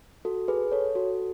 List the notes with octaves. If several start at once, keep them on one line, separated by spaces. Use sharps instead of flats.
F#4 A4
G#4 B4
A4 C#5
F#4 A4